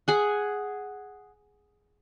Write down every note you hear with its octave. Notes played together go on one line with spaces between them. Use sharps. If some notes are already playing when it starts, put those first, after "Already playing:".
G#4 F#5